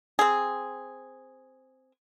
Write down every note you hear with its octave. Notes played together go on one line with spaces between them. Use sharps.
C4 G#4